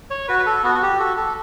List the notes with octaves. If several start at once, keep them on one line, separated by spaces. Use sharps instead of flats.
C#5
F#4 B4
B4
A4
B3 F#4
F#4
G4
F#4 A4
A4